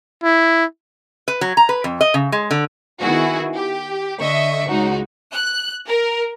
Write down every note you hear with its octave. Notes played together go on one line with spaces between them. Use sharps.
E4
B4
F#3
A#5
B4
F2
D#5
C#3
G#3
D3
D#3 B3 E4 F#4 G#4
G4
D3 D#5 E5 C#6
C#2 D#4 F#4
F#6
A#4